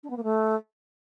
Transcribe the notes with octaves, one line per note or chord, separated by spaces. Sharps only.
D4
B3
A#3
A3